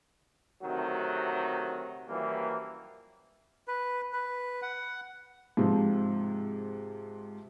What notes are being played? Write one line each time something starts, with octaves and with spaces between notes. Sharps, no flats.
D2 C3 D#3 F#3 F#4
F#2 E3 F3 G3 A#3
B4
B4
F#5
G#2 C3 F3 C4